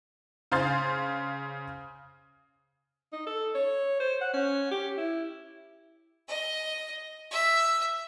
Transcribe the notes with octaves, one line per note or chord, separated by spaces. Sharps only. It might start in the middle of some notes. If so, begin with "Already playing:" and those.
C#3 C5 F5 C6 A6
D#4
A4
C#5
C5
F#5
C#4
G4
E4
D#5
E5